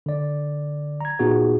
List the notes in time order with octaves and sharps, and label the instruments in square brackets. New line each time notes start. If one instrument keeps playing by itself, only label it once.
[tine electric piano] D3 D5
A#5 G#6
A#2 B3 D#4 F4 F#4 G#4